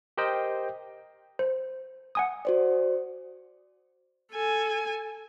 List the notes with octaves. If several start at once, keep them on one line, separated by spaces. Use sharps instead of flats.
G4 A#4 C5 D#5 G5
C5
F#5 G#5 D#6
F#4 C5 D5
A4 G#5